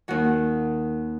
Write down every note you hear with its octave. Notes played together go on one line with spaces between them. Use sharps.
D#2 D#3 F#4